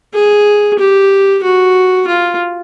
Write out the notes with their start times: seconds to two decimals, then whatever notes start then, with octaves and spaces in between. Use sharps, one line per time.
0.15 G#4
0.79 G4
1.44 F#4
2.08 F4